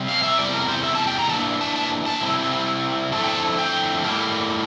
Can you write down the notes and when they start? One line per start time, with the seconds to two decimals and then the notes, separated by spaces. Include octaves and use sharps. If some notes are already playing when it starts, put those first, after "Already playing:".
Already playing: C3 G3 C4
0.08 F5
0.23 E5
0.38 E2 C3 G3 D5
0.53 A#4
0.68 C5
0.84 E5
0.95 A5
1.07 G5
1.19 A#5
1.29 F2 E3 A#3 D4 A5
1.61 A5
1.76 A5
2.06 A5
2.21 C3 G3 C4 E4
3.13 D3 F3 A3 C4 E4 A5
3.24 G5
3.28 A5
3.58 G5
4.04 A2 G3 A#3